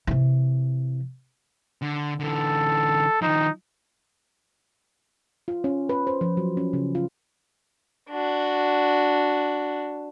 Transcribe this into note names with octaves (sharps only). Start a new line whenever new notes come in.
C3 E3
D3
D3 E3 A4
D#3 F3 D#4
F4
C#4
B4
C5
F3
F#3
C#4
C#3
F4
D4 F#4